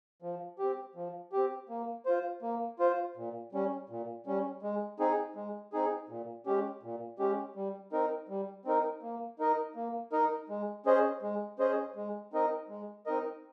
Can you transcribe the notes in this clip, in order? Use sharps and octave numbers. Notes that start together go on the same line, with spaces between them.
F3
C4 G4
F3
C4 G4
A#3
F4 C5
A#3
F4 C5
A#2
G3 C#4
A#2
G3 C#4
G#3
C4 D#4 G#4
G#3
C4 D#4 G#4
A#2
G#3 C#4 G4
A#2
G#3 C#4 G4
G3
C4 D#4 A#4
G3
C4 D#4 A#4
A#3
D#4 A#4 D#5
A#3
D#4 A#4 D#5
G#3
C#4 G#4 C5 D#5
G#3
C#4 G#4 C5 D#5
G#3
C4 D#4 A#4 D#5
G#3
C4 D#4 A#4 D#5